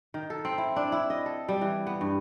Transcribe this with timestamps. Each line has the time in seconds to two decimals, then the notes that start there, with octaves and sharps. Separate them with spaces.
0.14 D#3
0.30 A4
0.45 C4
0.58 E4
0.76 D4
0.92 E4
1.10 D#5
1.26 A4
1.49 G3
1.61 E3
1.87 B3
2.01 G2